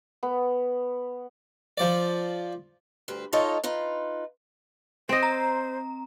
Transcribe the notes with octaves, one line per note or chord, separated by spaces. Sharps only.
B3
F3 D5
D2 G2 B4 C5
D#4 F4 A4 C#5 D#5
D#4 F4 B4
C4 C5 D#5
A#5